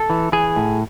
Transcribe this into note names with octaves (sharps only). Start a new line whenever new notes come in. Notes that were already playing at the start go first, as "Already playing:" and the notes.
Already playing: A4
E3
E3 G#4
A2